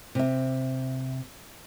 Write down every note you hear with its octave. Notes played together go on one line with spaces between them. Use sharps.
C3 E5